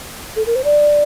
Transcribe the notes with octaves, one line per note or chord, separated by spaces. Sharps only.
A4
A#4
C5
D5